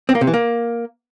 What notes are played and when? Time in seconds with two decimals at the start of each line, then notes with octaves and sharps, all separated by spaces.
0.09 C4
0.15 A#3
0.21 C3
0.27 E3
0.34 A#3